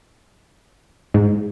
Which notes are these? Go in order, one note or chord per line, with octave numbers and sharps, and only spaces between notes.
G#2